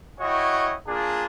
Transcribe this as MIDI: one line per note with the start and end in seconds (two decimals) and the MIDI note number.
0.20 0.75 64
0.20 0.75 66
0.20 0.75 73
0.20 0.75 75
0.20 0.75 79
0.87 1.26 58
0.87 1.26 62
0.87 1.26 65
0.87 1.26 68